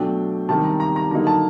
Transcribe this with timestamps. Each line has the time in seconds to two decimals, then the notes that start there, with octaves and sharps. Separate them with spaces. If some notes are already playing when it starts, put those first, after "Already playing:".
Already playing: B2 F#3 A3 D4 G5
0.49 C3 D#3 G3 A5
0.64 A#5
0.80 A#5
0.96 A#5
1.11 D3 F#3 A#3 D#4 A#5
1.27 A5